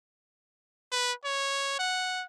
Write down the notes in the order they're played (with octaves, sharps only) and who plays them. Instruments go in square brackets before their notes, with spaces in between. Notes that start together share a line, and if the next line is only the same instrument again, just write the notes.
[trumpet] B4
C#5
F#5